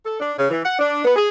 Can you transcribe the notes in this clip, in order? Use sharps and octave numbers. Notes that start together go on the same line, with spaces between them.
A4
D4
C#3
E3
F#5
D4
B3
G#4